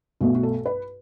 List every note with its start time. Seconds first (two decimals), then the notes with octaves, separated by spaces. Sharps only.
0.21 B1 B2 A3 F#4
0.35 F#4
0.43 A4
0.66 B4